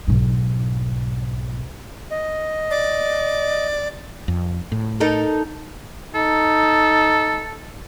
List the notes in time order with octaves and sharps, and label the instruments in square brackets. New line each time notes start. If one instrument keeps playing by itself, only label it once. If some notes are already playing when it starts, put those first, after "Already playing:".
[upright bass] B1 G#2
[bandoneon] D#5
[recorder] D5
[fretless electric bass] F2
A2
[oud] D#4 A4 A#4
[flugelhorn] D#4 [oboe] A4